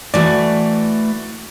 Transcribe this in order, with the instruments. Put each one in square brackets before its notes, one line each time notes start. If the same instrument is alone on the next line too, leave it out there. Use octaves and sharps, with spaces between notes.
[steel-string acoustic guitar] E3 A3 B4 [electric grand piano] F#4 D5